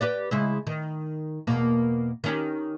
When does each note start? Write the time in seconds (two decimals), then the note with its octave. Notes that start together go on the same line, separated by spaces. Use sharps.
0.01 G4 B4 D5
0.31 C#3 G#3 E4
0.67 D#3
1.47 E2 B2 A#3
2.24 D#3 C#4 G4